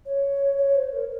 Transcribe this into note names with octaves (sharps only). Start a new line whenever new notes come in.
C#5
C#5
C5
A#4